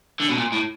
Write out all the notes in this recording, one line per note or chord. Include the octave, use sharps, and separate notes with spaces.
D3
B2
A#2
A2